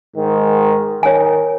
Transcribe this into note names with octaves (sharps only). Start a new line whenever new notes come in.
G#2 D#3
D#3 C#5 G#5